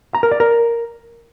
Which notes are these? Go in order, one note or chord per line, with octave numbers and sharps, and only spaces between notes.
A#5
A#4
D5
A#4